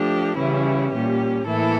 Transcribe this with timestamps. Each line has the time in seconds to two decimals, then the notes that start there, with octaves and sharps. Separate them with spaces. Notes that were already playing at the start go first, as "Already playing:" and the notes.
Already playing: F3 A3 D4 G4
0.37 C#3 E3 G3 C#4 E4
0.92 A#2 G3 C#4 G4
1.46 A2 E3 A#3 E4 A4